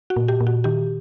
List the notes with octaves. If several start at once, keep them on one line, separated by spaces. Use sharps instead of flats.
F#4
A#2
G4
A#2
F#4
D#3 G4